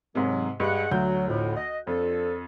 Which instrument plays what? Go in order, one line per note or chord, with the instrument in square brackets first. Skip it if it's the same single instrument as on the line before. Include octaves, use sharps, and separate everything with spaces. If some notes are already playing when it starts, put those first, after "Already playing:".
[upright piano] G#2 C3 [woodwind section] D#3 F#3
[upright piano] G2 F#6 [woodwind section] G#3 F#5
[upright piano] D2 G6 [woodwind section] F#3
[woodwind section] F2 A2
D#5
[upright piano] F2 [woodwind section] F3 D4 A4